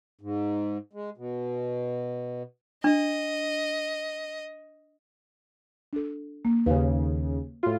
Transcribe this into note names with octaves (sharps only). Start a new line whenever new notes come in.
G#2
G#3
B2
D4 D#5
D4 A4
A#3
D#2 C#3 B4 F5
A2 F4 F#4